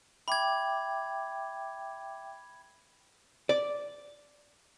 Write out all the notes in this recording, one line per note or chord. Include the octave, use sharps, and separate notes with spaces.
E5 G5 B5 D6 G#6
D5